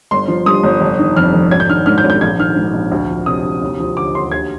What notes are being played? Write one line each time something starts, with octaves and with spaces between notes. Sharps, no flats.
G1 C6
F3
G2 D#6
G1
F1
D#3
F2 F6
F1
G#1 G#6
G6
D#3 F6
G#2 F6
G6
G#1
G6
A#1 G#6
D#3 F6
G#2
A#1
D2
F3
C3 D#6
D2
D#2
F3
D3 D6
D#2 C6
D2 G#6